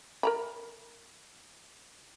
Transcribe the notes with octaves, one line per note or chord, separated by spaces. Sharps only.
A#4 A#5 B5